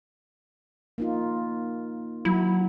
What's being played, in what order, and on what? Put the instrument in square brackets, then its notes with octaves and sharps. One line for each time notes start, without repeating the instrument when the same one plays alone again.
[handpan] A#3 D#4 F4
[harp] F#3 [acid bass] E4